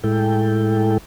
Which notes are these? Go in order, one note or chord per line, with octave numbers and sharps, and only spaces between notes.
A2 G#3 E4 A4 G5